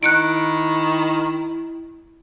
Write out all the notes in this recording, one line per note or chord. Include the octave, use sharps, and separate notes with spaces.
D#3 E4 F#6 C#7 D7